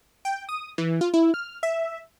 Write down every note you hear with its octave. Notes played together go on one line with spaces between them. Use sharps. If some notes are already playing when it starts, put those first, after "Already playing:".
G5
D#6
E3
F4
E4
F6
E5